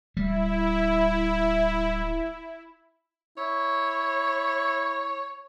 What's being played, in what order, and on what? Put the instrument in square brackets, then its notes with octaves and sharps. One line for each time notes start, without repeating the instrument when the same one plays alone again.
[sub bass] D1 [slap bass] G3 [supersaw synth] E4
[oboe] E4 [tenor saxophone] C#5